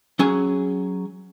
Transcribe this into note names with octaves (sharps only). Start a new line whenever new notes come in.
F#3 C#4 G#4 G#5